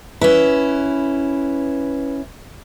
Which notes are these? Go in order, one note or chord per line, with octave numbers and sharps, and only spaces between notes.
C#4 E4 B4